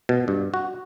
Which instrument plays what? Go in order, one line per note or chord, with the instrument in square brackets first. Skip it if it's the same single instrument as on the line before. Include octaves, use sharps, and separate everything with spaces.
[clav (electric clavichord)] B2
G2
F#4